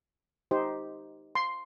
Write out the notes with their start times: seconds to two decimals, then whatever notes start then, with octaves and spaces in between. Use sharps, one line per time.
0.51 D#4 G4 C5
1.35 C6